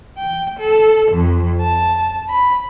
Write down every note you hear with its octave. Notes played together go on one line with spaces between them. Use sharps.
G5
A4
F2
A5
B5